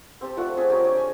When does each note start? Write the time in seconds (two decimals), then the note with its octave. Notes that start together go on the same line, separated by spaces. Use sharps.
0.21 C4 G4 A5
0.37 F3 A3 D5 F#5
0.57 G#4 E5 G#5 A5
0.70 G4 G#4 A#4 C#5
0.83 D4 C#5
0.97 G#5